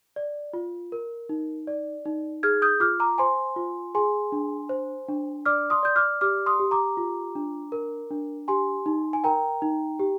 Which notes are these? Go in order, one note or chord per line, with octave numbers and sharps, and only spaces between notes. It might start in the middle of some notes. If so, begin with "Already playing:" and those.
D5
F4
A#4
D#4
D5
D#4
G#4 F6 G#6
D#6 G6
F4 D6 F6
A#5 D6
C5 G#5 C6
F4
G#4 G#5 C6
D4
C5
D4
D5 D6 F6
C6 D#6
D5 G6
D6 F6
G4 D6 F6
C6 D#6
G4
A#5 D6
F4
D4
A#4
D4
G4 G#5 C6
D#4
G#5
A#4 G5 A#5
D#4
G4